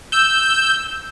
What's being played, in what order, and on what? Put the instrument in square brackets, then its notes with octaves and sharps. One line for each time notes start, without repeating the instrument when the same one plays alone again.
[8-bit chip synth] E6 G6